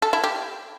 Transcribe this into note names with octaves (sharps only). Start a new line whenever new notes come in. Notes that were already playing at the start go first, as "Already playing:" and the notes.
A4
E4
G4